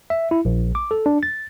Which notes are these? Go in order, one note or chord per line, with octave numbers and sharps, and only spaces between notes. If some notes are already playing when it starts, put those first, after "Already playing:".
E5
E4
A#1
D6
A4
D4
A6